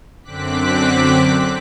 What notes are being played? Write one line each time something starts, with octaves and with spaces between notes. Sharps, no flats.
F#2 D3 C4 D6 F#6 B6